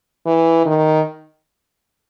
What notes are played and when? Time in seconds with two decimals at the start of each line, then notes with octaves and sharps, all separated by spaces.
0.26 E3
0.66 D#3